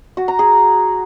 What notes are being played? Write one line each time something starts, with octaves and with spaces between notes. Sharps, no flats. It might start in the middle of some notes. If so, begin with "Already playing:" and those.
F#4
A#5
G#4